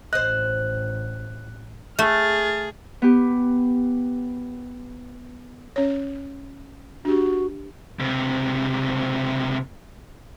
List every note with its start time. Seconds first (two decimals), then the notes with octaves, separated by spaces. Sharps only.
0.13 A1 C5 D#5 F#6
1.99 A3 G#4 F6 A6
3.02 B3 G4
5.76 C#4 C#5
7.05 D4 F#4 G4
7.99 C#2 C3